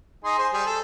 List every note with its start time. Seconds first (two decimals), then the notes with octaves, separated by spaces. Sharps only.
0.24 D#4 G#4 C6
0.38 G#4 C5
0.53 G3 G#4
0.66 A4